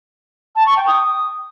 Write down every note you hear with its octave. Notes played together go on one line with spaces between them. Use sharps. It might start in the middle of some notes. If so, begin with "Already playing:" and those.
A5
C#6
G5
D#6